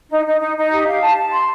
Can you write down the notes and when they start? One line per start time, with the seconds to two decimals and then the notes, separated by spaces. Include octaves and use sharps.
0.09 D#4
0.26 D#4
0.40 D#4
0.56 D#4
0.71 G4
0.86 F5
1.02 A5
1.17 A5
1.32 C6